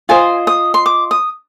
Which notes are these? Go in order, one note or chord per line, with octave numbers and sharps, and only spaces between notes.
F4 C5 D#5 G#5
D#6
C6
D6
D#6